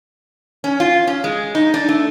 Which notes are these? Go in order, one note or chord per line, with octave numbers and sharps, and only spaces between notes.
C#4
F4
C#4
G#3
D#4
D4
A3